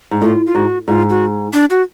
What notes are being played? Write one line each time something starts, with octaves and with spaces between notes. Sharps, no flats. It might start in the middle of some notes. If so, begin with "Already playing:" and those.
G#2
A2 F4
F4
G#2 F#4
G#2 F4
F#4
D4
F#4